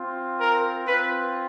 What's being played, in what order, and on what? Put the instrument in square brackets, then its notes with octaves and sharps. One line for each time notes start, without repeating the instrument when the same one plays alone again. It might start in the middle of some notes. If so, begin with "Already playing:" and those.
Already playing: [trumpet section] C4 F4
A#4
C4 F4 B4